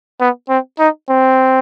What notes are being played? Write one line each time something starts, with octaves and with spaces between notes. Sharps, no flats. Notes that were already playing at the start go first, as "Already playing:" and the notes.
B3
C4
D#4
C4